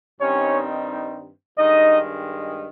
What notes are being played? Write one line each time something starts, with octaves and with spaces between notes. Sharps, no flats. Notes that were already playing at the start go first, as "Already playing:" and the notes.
G2 D#3 G3 C4 C#4 D#4 C#5
G2 D#3 G#3 D#4 D#5